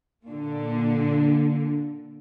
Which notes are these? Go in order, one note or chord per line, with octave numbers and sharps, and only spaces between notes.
A#2 D3